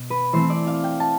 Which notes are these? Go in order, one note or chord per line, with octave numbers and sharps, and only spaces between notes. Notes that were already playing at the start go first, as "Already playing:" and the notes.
Already playing: B2
B4
E3 A3 C4 C5
D5
F5
G5
A5